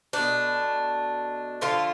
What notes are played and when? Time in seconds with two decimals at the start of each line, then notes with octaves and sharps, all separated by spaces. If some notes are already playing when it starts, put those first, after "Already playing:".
0.13 B2 A3 D4
1.61 D3 F3 A3 F4